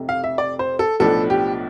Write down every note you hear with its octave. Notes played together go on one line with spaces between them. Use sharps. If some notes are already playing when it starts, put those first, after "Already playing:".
Already playing: F1 F2 C3
F5
E5
D5
C5
A4
B1 A2 F3 B3 D4 A4
G4